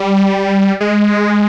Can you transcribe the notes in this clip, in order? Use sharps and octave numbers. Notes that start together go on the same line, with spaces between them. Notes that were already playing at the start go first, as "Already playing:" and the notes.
Already playing: G3
G#3